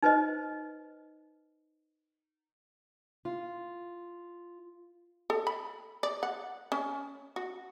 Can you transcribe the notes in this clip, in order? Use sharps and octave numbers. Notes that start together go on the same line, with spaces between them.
D#4 B4 C5 D#5
F4
A4
B5
D5
F#5
C#4
F#4